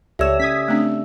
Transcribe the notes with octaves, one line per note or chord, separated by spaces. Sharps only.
C#2 G4 A4 C#5 D5 E5 E6 E7
C#3 C#4 D#6 G#6 B6
A3 C4 D4